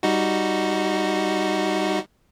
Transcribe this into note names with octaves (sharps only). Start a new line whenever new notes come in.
G3 D#4 F#4